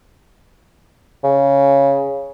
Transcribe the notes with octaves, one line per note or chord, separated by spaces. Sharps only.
C#3